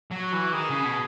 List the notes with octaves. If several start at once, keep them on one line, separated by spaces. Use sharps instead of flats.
F#3
F#4
E3
D#3 G#4
C#3
B2